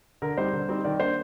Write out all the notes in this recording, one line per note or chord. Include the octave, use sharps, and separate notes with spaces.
D3 A#4
G3 C4 D#4 C5
D3
G3 C4 D#4
D#3 D5
A#3 D4 C5